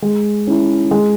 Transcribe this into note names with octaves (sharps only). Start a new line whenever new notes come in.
G#3
C#4 E4
G#3